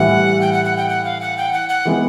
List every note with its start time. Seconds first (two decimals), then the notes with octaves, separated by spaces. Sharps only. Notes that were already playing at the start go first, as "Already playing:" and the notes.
Already playing: A2 E3 G3 F#5
0.41 G5
0.53 F#5
0.65 F#5
0.77 G5
0.89 F#5
1.05 F5
1.21 F#5
1.37 G5
1.53 F#5
1.69 F#5
1.85 E3 G#3 B3